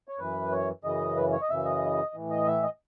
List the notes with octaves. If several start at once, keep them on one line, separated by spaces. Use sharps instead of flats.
C#5
F#2 E3 B4
C#5
F#2 C#3 E3 D#5
B4
C#5
D#5
F#2 C#3 E3 E5
D#5
A2 E3
D#5
E5
D#5